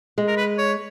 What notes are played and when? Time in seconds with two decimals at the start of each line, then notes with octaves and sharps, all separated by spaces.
0.18 G#3
0.28 A#4
0.37 B4
0.58 C#5